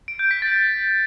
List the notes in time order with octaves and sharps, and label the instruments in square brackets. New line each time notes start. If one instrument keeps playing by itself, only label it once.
[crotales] D7
G6
B6
A6